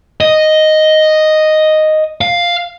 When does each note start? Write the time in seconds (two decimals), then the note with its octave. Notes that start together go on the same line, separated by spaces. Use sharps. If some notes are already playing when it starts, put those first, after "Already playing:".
0.21 D#5
2.21 F5